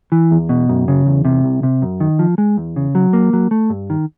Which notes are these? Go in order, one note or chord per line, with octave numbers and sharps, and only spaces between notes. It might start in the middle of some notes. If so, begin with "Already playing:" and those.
E3
E2
B2
F#2
C#3
E2
C3
C2
C3
F#2
D#3
F3
G#3
E2
C#3
F#3
A#3
F#3
A3
G2
D#3